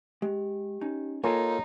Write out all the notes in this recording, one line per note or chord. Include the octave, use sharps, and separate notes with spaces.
G#3 G4
C#4 D#4
A#3 D#4 F4 A4 C#5 G#5